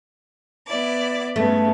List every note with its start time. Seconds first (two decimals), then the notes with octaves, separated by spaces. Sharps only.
0.67 B3 E4 D5
1.36 G2 C#3 A3 B3